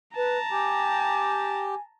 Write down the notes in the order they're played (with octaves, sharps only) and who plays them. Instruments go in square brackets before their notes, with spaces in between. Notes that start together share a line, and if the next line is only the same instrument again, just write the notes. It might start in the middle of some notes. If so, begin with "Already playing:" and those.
[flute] B4 [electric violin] A5 A#5
[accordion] G4 [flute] G#5